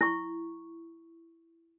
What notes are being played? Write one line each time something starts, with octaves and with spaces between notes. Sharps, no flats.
E4 C#6